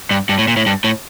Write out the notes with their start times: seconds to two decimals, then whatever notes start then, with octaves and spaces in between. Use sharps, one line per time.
0.11 G2
0.29 G2
0.38 A2
0.48 A#2
0.57 A2
0.66 G2
0.84 A2